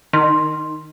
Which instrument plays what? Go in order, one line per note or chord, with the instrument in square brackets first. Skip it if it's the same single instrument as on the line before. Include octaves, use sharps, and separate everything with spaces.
[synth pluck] D#3 [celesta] D#4 C6